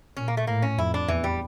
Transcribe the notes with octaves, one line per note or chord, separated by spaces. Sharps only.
A#2 C#4
A#3
A3
A2 A#3
C#4
F2 E4
D4
E2 E3
G3